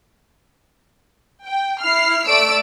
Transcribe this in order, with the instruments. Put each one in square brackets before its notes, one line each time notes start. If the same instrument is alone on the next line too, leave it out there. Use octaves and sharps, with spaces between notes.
[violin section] G5
E4 F6 C7
A3 D5 E6 D7